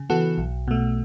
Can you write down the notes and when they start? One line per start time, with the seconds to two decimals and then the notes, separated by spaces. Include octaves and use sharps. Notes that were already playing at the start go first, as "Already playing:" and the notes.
Already playing: C#3
0.10 E3 B3 F#4 A4
0.38 B1
0.68 B2 A3